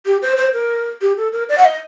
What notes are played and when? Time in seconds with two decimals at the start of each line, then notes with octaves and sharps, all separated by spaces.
0.06 G4
0.22 C5
0.37 C5
0.54 A#4
1.02 G4
1.17 A4
1.33 A#4
1.49 D5
1.58 F#5
1.65 D#5